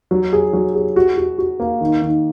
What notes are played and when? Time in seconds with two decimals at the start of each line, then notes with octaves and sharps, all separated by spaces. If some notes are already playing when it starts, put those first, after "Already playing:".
0.11 F#3
0.33 G#4
0.53 F#3
0.75 G#4
0.96 F#4
1.18 F#4
1.38 F#4
1.60 A#3
1.81 D#3
2.02 D#3